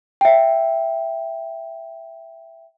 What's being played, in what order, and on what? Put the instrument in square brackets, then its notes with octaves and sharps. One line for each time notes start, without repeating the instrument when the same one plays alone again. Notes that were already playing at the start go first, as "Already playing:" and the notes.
[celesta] E5 G5